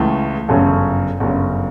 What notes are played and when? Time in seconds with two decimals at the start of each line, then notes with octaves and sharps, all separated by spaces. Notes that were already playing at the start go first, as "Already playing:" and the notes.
Already playing: C#2 C#3 E3 A3
0.48 G1 F#2 C#3 A4
1.20 G1 F#2 C#3